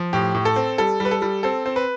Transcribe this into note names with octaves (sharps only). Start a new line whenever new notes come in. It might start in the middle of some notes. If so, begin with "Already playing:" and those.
Already playing: F3
A2 G4
A2
A4
C4
G3 A4
G3 B4
A4
G3
C4 A4
C4
B4